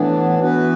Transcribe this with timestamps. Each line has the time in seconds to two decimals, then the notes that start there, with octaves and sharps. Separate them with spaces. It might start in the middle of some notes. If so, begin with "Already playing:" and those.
Already playing: A2 E3 B3 D4
0.39 E3 B3 F#4 B4